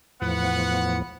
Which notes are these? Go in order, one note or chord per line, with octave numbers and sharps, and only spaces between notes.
E2 A2 F3 B3 F#5